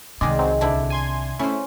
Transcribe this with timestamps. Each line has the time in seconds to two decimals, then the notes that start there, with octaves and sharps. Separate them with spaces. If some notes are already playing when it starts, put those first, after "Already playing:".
0.21 C2 C3 D#3 G#3 G#4 D5
0.39 F#3 C4
0.61 D2 D3 D4 E4
0.90 G#5 C6 G#6
1.39 A3 C#4 E4 C5